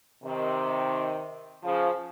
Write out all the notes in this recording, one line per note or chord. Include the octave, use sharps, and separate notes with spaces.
C3 D#3
C#3 F3